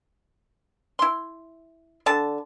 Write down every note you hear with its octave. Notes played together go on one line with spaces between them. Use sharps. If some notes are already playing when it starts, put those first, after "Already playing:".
E4 C6
D3 A4 A5